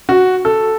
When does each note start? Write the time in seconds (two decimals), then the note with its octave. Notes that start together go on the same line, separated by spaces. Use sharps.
0.09 F#4
0.45 A4